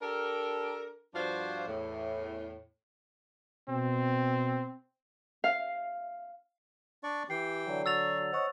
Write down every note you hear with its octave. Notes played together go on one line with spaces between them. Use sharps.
D4 G4 A4 A#4
G2 F3 D4 F4 F#4 C5
E2 A2
B2 C4
F5
D4 D5 C#6
E3 G4 G5 C7
D3 F#3
F#4 E6 A6 F7
C5 C#5 D#5 F#5 C#6